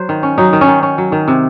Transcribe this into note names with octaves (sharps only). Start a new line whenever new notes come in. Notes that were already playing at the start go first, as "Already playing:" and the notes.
Already playing: F#3 C5
D#3
C#4
F#3 D#4
D#3
C#4
D#3
C#4
F#3
D#3
C3